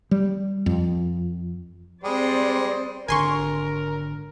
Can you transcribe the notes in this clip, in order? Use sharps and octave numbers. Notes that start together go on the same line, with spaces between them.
G3
F2
G3 G#3 C4 C5 D5
G#1 D3 A#4 G#5 C6 C#6